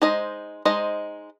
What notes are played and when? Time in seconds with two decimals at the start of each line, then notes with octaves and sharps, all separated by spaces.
0.02 G#3 D#4 C5 D#5
0.65 G#3 D#4 C5 D#5